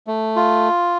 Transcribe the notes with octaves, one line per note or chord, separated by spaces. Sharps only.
A3
F4